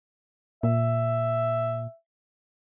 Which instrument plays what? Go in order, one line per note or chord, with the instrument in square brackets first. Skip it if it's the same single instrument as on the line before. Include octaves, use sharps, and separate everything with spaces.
[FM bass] A#2 [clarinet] E5